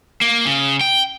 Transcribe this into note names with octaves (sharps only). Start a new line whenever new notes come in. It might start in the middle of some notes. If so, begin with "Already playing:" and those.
A#3
C#3
G5